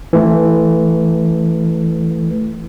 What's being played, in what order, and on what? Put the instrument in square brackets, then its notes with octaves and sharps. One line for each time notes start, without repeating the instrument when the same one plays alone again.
[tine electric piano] E3 A3